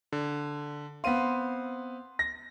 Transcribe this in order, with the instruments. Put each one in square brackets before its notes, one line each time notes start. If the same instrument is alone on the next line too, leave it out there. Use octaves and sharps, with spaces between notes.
[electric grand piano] D3
[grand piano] B3 C4 F5 [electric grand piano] C6 D#7
[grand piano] A#6